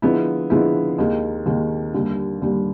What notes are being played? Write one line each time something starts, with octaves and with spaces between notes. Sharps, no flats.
D3 F3 G#3 B3 E4
D3 F3 G#3 B3 E4
D#2 D#3 G#3
D#2 D#3 G#3
D#2 D3 G3
D#2 D3 G3